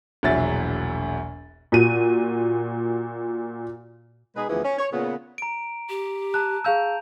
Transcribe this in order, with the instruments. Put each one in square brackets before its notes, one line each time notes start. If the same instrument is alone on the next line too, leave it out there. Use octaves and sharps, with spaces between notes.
[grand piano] E1 A#1 E2 F#3 E5 A6
[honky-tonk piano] A#2 F#4 D#7
[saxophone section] B2 G#3 D#4 G#4 B4
D2 E3 F3 B3 E4 G#4
C#4
C#5
A#2 C#3 B3
[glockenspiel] A#5 D7
[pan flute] G4
[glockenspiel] A5 A#5 [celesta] F#6
[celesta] G#4 F5 E6 [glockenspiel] A5 G6 F7